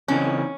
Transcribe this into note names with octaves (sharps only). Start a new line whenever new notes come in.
C#3 E3 C4 C#4 D#4